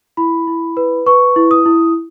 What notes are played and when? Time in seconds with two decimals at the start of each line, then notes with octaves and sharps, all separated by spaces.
0.17 E4 B5
0.47 E4
0.77 B4
1.06 B4 C#6
1.36 E4
1.51 D#6
1.66 E4